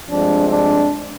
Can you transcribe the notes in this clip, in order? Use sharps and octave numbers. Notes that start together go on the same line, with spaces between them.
G2 F3 G#3 C4 D4
D4